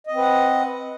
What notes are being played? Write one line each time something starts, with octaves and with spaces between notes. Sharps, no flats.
C4 B4 D#5 F#5